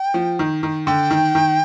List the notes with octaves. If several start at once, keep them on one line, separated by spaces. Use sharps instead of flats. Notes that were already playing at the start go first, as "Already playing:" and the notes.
Already playing: G5
F3
D#3
D#3
D3 G5
D#3
D#3